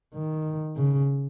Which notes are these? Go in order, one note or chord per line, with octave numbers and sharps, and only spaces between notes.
D#3
C#3